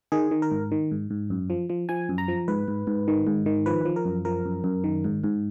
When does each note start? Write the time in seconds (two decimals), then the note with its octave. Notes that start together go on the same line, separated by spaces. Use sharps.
0.12 D#3 G#4
0.31 D#3
0.42 A#4
0.51 G#2
0.72 D#3
0.91 G#2
1.10 G#2
1.30 F#2
1.50 F3
1.70 F3
1.89 F3 G#5
2.09 F#2
2.18 A#5
2.28 F3
2.48 G#2 B4
2.68 G#2
2.87 G#2
3.08 D#3
3.27 G#2
3.46 D#3
3.66 F3 B4
3.85 F3
3.96 A#4
4.05 F#2
4.25 F3 A#4
4.45 F#2
4.64 F#2
4.84 D#3
5.04 G#2
5.24 G#2